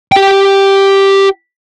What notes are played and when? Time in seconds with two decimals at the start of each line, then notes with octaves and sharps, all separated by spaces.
0.12 G4 G5